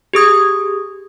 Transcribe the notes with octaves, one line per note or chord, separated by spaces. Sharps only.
G4 G#4 D#6 G#6